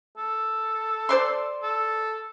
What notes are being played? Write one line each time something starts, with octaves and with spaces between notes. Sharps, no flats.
A4
C5 D5 C6
A4